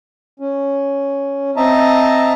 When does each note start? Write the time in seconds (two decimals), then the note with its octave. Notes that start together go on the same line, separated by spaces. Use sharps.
0.40 C#4
1.57 C4 D#5 E5 A5 A#5